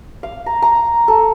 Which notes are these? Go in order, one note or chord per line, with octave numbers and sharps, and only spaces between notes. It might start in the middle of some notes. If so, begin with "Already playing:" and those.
F5
A#5
A#5
A4